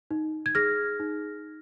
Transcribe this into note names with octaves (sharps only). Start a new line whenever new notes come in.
D#4
G#6
G#4 F6 A#6
D#4